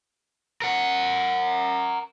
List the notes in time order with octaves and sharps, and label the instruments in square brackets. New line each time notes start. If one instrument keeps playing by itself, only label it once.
[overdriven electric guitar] A#4 F#5